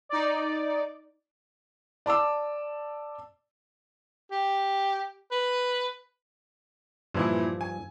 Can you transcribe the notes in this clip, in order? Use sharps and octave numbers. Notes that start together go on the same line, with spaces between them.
D#4 D5
D5 A5 D6 E6
G4
B4
G2 A#2 E3 F3 E4
G#5